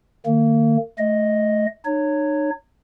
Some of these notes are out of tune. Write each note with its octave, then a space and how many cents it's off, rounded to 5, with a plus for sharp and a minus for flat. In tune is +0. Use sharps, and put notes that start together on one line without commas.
D#3 -40 A#3 -35
A3 -20 D#5 +0
D#4 -40 C#5 +0